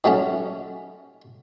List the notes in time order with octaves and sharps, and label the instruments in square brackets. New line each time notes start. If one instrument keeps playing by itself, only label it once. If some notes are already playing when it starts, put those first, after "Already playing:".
[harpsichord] D#3 F#3 A3 C#4